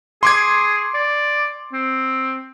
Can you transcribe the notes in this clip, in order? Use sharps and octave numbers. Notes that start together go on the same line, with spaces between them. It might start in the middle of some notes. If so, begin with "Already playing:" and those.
G#4 C6 D6 G#6
D5
C4